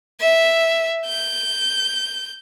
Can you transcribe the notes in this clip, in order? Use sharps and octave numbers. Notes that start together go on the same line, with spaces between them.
E5
G6